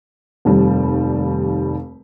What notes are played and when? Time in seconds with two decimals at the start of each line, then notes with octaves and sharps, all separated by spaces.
0.45 F1 D#2 G3